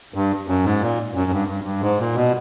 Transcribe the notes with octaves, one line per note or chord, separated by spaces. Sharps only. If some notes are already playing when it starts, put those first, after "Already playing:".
G2
F#2
G#2
A#2
F#2
G2
G2
G2
G#2
A#2
B2